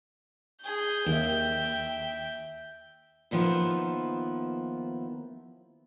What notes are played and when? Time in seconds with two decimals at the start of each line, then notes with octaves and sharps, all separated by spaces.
0.63 G#4 G6
1.06 D#2 E5 G5
3.31 D#2 D#3 F3 B3 E4